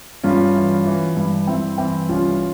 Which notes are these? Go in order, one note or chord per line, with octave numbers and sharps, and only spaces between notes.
G2 C#4 F4
E3
E3
G2
G2 C4 E4
E3 C4 E4
C2 C#4 F4